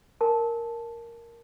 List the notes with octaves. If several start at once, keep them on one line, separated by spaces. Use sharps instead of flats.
A#4 G#5 A5